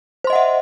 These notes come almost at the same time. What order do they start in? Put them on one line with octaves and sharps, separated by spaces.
C5 C6 D#5 F#5 E5